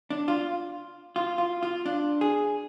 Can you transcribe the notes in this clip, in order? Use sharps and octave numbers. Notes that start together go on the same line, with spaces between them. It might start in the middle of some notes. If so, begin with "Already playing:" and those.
D4
F4
F4
F4
F4
D4
G#4